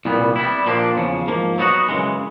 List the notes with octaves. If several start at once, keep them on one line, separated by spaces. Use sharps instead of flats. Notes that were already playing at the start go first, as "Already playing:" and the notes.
C2 A#2 G3 B3
G3 B3 E4
A#2 F3 A#3 D4 G4
E2 C#3 F3
G#2 F3 A#3
F#3 B3 D#4 F#4
F#2 C#3 E3 G#3